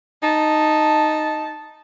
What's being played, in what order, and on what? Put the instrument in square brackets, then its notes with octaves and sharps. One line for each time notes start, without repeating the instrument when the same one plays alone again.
[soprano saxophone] D#4 [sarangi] A5